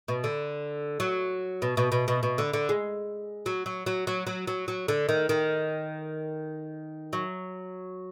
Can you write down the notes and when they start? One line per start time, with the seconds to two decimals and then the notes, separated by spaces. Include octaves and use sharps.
0.08 B2
0.24 D3
1.00 F#3
1.62 B2
1.77 B2
1.92 B2
2.08 B2
2.23 B2
2.38 D3
2.53 D3
2.69 G#3
3.46 F#3
3.66 F#3
3.86 F#3
4.07 F#3
4.27 F#3
4.47 F#3
4.68 F#3
4.88 D3
5.09 D#3
5.29 D#3
7.13 F#3